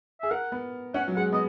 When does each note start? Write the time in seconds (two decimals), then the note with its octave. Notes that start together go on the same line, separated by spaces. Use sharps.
0.21 G#4 E5
0.31 A#4 F#5
0.52 B3
0.94 C#4 F#5
1.08 F#3
1.16 G#3 F#5
1.32 B3 D#5